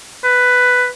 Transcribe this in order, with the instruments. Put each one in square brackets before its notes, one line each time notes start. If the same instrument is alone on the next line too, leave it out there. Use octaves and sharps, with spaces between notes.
[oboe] B4